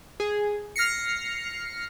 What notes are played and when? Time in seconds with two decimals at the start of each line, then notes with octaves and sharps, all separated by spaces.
0.20 G#4
0.76 F6 A#6 C7 C#7